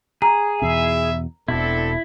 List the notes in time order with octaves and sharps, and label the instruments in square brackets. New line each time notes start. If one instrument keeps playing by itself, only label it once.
[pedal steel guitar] G#4 [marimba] A#5
[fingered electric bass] E2 B2 [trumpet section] D#4 E4 E5
[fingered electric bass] E1 B2 [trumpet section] C4 D4 A4 [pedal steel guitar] E4